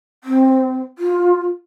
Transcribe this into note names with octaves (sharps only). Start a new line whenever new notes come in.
C4
F4